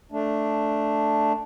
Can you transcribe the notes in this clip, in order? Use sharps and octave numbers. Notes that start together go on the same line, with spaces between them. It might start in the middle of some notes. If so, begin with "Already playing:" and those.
A3 D4